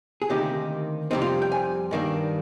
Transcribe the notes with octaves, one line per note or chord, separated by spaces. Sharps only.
G#4
D2 C3 D#3 A#3 D#4 G4
F2 C3 G3 C4 D#4
F4
G5
G#5
G2 D#3 G3 A#3 D4